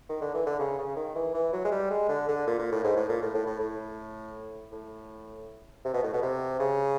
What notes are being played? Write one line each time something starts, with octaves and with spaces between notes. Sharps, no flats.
D#3
D3
E3
D3
C#3
C#3
D#3
E3
E3
F#3
G#3
G3
G#3
D3
D3
A#2
A#2
A2
G#2
A2
A#2
A2
A2
A2
A2
A2
C3
B2
A2
B2
C3
C#3